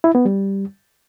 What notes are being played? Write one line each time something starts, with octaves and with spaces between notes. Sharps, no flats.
E4
B3
G3